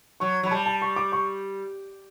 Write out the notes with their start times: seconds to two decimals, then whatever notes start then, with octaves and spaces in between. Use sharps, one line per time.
0.20 F#3 C#6
0.43 F#3
0.46 B5
0.51 G3 A5
0.66 A5
0.82 C#6
0.96 D6
1.12 C#6